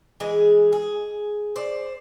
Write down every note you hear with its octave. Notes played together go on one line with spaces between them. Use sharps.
E3 G#3 G#4
G#4
C5 D5